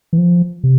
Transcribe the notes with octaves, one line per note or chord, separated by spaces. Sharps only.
E3
F3
C3